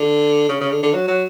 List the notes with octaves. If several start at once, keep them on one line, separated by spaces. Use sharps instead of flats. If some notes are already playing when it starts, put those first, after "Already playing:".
Already playing: D3
C#3
C#3
D3
D3
F#3
F#3